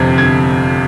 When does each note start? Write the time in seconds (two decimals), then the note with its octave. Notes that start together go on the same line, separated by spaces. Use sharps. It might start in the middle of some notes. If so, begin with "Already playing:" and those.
Already playing: G1 F2 C3 G#6
0.18 G1 G#6